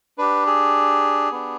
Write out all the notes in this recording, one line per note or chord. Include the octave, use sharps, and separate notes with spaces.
D4 G4 B4
G#4
B3 D4 G4